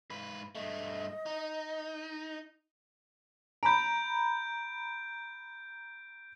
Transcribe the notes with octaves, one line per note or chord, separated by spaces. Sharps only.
G#2 B4
G2 A3 D#5
D#4
A#5 B5 G6 D7